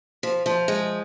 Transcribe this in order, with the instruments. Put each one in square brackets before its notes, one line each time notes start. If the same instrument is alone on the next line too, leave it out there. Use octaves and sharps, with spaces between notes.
[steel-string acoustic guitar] F3
F3
G#3